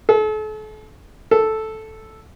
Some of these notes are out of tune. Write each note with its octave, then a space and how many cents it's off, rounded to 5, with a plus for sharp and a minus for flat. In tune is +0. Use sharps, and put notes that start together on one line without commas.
A4 -40
A4 -5